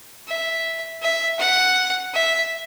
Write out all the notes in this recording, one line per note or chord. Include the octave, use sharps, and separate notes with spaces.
E5
E5
F#5
E5